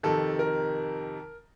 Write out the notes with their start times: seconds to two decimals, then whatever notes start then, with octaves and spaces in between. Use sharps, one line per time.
0.03 F2 C3 D#3 A4
0.39 A#4